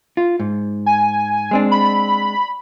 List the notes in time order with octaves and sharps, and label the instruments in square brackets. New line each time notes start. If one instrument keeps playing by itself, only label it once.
[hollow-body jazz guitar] F4
G#2
[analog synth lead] G#5
[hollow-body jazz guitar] G#3 C4 D4
[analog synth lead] B5